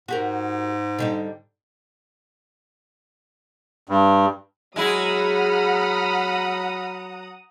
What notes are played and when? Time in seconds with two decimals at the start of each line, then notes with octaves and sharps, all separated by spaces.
0.08 G#2 F#4 G4 A#4
0.99 D3 G3 D#4
3.89 G2
4.76 F#3 G#3 E4 F#5 A#5 B5 D#6 F6